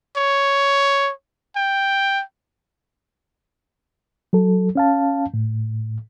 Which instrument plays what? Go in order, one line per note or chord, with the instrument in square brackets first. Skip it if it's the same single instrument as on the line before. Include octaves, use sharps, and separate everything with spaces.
[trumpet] C#5
G5
[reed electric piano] F#3 A4
C#4 F5 A5
A2